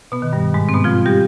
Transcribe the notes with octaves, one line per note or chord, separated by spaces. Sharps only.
B2 B3
D#3
G2 G3
G#2 G#3
C4
B2 B3
F3 F4
G3 G4